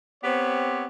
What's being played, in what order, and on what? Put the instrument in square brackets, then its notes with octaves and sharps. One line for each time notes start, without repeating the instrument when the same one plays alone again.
[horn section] B3 C4 G4 C5 C#5